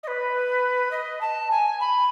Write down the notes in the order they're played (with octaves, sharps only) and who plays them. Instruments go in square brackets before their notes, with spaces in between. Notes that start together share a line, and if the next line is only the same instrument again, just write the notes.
[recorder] D#5
B4
D#5
A5
G#5
B5